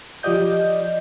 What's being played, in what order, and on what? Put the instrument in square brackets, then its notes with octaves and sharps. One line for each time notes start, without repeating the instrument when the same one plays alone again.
[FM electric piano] F3 F4 G4 D5 D#5 G6